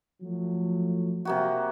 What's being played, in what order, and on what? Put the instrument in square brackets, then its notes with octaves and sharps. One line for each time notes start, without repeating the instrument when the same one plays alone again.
[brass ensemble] F3 F#3 A3
[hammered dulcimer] C3 A#3 F#4